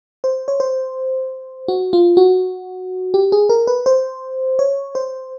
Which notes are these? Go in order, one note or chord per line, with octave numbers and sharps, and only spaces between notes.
C5
C#5
C5
F#4
F4
F#4
G4
G#4
A#4
B4
C5
C#5
C5